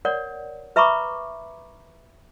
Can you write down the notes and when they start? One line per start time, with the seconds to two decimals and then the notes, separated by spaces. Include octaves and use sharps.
0.05 A#4 C#5 D5 F#5
0.76 B4 E5 A#5 B5 C#6 D6